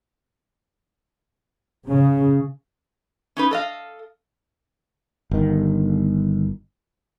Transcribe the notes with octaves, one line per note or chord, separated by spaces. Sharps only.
C#3
C#4 D#4 B4
A4 D#5 F5
G1 D#3